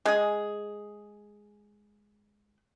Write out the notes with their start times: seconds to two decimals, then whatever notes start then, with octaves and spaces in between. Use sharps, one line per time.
0.06 G#3 G#4